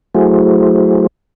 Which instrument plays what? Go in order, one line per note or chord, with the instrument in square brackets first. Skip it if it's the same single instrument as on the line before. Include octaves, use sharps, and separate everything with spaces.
[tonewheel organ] F#3 A3 E4 F#4 G#4 C5